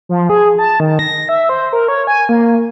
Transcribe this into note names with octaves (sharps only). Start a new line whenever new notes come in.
F3
G#4
A5
D#3
A#6
E5
C5
A#4
C#5
G#5
A#3